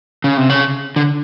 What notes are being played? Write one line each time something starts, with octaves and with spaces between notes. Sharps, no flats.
C#3
C3
C#3
D3